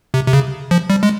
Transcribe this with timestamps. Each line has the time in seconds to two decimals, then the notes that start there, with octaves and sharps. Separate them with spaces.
0.14 C3
0.27 C3
0.33 C#3
0.71 F3
0.90 G3
1.03 G#3